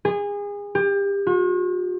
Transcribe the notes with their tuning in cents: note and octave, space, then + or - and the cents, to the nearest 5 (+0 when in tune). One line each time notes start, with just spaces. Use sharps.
G#4 -30
G4 +30
F#4 -45